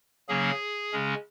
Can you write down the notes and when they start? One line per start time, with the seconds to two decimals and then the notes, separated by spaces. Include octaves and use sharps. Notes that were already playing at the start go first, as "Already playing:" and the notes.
0.28 C#3 F#3 A#3 C#4 G#4
0.92 C#3 G#3 C#4